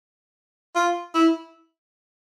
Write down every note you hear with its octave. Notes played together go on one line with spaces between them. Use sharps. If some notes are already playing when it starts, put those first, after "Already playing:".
F4
E4